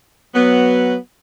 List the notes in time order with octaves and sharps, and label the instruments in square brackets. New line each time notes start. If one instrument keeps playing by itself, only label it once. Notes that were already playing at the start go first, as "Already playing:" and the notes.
[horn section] F#3 B3